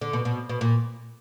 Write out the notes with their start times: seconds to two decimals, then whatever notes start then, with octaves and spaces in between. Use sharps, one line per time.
0.01 D3
0.13 B2
0.25 B2
0.49 B2
0.61 A#2